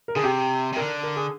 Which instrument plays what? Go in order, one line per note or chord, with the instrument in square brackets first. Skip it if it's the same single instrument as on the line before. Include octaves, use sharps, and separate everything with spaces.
[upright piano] A#4
[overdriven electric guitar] D3 [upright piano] G#4
[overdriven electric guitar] C3 [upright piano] G4
[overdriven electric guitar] C3
[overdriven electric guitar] D3 [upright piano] A#4
[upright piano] A#4
G#4